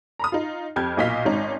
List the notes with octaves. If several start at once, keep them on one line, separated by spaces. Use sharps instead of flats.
A#5 B5 D#6
D#4 F4
F2 G4 F6 G6 G#6
B1 A#2 D#5 F5 B6
G#1 C#4 D#4